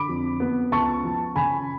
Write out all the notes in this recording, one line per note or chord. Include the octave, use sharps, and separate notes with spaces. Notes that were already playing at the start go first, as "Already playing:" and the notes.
Already playing: D3 B5 D6
F2
B3
C#2 A5 C#6
F3
C#3 G#5 B5